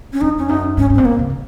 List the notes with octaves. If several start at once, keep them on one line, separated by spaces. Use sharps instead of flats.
C#4
F2 D#4
C#4
F#2 D#4
G#2 C#4
G#2
A#2 C4
A#3
C3
C3